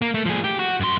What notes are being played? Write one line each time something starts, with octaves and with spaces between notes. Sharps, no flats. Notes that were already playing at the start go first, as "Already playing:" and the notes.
A#3
A3
F3 G#4
G4
F#4
F#2 C6